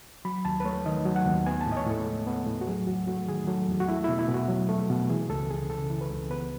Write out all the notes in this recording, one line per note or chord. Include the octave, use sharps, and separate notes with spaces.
F#3 B5
D#2 A5
B4
A3 C#5
D#3 D#5
F#3
F#5
D#2
B3 G#5
A5
A2
D#5
C#5
A2 A4
G#3
B3
A2
F#4
F#3 G#4
E2 F#4
A3 F#4
D#3 G#4
F#3 A4
E2
F#4
A3 E4
B2 E4
E4
B2
F#4
F#3
A3
B2
E3 G#4
C#2 A4
C#2 G#4
C#3 A4
E3
B4
C#2
B3 B4